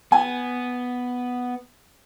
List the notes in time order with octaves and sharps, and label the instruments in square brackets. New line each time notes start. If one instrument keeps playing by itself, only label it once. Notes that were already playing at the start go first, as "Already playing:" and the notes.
[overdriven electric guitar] B3 [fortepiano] G#5